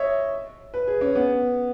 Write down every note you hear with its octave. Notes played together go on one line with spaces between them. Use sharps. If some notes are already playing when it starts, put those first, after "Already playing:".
Already playing: C#5 D#5 E5
B4
G#4
C#4
B3